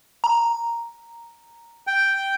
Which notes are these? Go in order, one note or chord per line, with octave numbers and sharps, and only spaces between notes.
A#5
G5